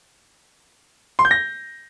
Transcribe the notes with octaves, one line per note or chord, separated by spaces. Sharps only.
C6
G6
A#6